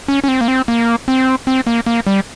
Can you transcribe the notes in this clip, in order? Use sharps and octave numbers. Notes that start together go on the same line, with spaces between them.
C#4
C#4
C4
A#3
C4
A#3
C4
C4
A#3
A#3
G3